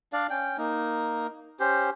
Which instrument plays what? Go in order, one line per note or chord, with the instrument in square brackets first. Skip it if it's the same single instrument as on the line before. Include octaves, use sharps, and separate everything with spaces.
[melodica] D4 D5 F5
C#4 G5
A#3 D#4
C#4 G4 C5